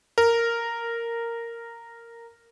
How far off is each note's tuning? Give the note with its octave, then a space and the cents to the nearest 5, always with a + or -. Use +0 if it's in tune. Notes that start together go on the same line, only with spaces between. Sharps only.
A#4 -10